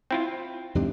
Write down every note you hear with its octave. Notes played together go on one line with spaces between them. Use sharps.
C4 E4 F4
E2 G#2 C3 D4